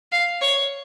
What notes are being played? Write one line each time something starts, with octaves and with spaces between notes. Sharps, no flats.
F5
C#5